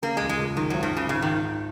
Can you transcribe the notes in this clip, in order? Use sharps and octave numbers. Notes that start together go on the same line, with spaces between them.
C#3 A#3
G#3
C#2
G#3
C#2
F#2 D#3
G#1 F#3
D#3
G#1 C#3
G#2 C#3
D#3